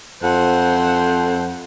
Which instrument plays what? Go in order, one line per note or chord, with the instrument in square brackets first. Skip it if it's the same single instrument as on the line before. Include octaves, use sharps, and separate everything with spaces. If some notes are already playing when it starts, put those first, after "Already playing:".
[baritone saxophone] F2 [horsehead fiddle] C5 F#5